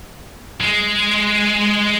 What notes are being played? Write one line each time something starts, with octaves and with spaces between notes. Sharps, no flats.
G#3